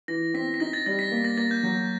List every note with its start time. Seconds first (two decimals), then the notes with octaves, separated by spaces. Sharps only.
0.08 E3 A#6
0.34 C4 B6
0.54 B6
0.60 D#4 A#6
0.73 A6
0.86 G3 A#6
0.99 B6
1.12 A#3
1.24 A#6
1.37 A#3 A6
1.51 G6
1.63 F#3